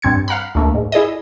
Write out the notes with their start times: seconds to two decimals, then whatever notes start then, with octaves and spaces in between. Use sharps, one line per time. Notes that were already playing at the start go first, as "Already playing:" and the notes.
0.02 G2 C4 G#6 C#7
0.28 F5 F#5 A#5 B5
0.55 D2 A3 A#3
0.74 G#2
0.92 E4 G#4 D5 D#5